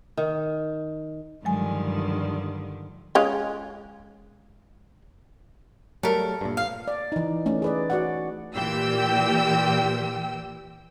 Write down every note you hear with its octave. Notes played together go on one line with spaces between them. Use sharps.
D#3
G2 D3 D#3 F3 F#3 G#3 G#5
G#3 C#4 F4
F#3 G3 A3 A4 A#4
G2 A#2
F5
D5
E3 D#4
A3 C#4
G#4 B4 D5
F#4 D5 F#5
A#2 E3 G4 G5 E6